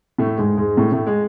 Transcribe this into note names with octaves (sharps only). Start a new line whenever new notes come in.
A2 A3
G#2 G#3
G#2 G#3
A2 A3
A2 A3
G#3